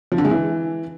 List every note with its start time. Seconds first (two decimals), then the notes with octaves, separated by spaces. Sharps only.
0.12 F3
0.18 D3
0.25 G#3
0.31 E3